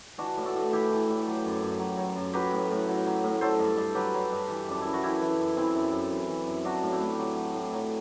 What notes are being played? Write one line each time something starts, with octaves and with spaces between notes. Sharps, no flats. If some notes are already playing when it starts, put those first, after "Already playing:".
E3 D4 F#4
A2
F#4 A4
A2
E3 E4 G4
E3
A2
F#3
F#2
F#2
F#3
F#3
F#2
F#3 G4 B4
A2
A2
F#3
F#3
A2
F#3 A4 C5
G2
G2
F#3 G4 B4
F#3
G2
E3
F#2 D4
F#2 E4
F#4
E3 E4 G4
E3
F#2
E3 C4 E4
F#2
F#2
E3
E3
F#2
F#3 D4 F#4
A2
E4 G4
A2
F#3
F#3
A2
F#3